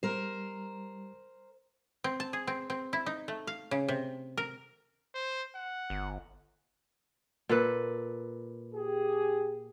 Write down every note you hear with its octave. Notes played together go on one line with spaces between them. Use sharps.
G3 A#4 C5
C4
A5
G#4
C4
C4
E4
D#4
A3
F5
C#3
C3
A#4
C5
F#5
G1
A#2 A4 B4
G4 G#4